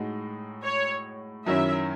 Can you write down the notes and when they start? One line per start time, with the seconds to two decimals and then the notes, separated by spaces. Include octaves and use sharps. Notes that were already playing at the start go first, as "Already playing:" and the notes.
Already playing: A2 G#3 D#4 F#4
0.63 C#5
1.46 F#2 D#3 F#3 C#4 E4 E5